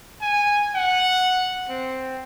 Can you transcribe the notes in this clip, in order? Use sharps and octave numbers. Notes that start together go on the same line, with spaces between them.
G#5
F#5
C4